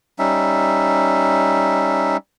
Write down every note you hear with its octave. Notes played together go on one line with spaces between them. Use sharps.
G3 C#4 D#4 E5